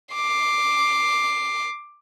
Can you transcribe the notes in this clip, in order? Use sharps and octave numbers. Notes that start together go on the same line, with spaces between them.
D6 C7